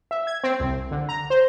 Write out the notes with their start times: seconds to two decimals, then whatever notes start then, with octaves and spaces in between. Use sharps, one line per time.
0.11 E5
0.27 G#6
0.44 C4
0.60 C2
0.91 D3
1.09 A#5
1.30 C5